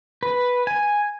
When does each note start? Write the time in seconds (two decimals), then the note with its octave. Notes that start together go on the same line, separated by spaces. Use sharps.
0.23 B4
0.67 G#5